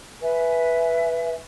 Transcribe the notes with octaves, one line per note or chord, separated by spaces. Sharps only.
B4 E5 G#5